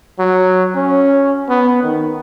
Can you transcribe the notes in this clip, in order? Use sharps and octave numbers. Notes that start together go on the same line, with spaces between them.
F#3
C#4
B3
D#3